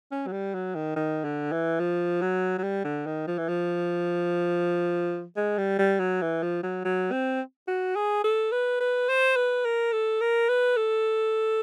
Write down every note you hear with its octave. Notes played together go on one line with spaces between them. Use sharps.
C#4
F#3
G3
F#3
D#3
D#3
D3
E3
F3
F#3
F#3
G3
D3
D#3
F3
E3
F3
G#3
G3
G3
F#3
E3
F3
F#3
F#3
C4
F#4
G#4
A4
B4
B4
C5
B4
A#4
A4
A#4
B4
A4